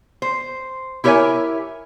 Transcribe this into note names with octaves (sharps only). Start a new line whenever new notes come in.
C5
E4 G4 A#4 C#5 E5 G#5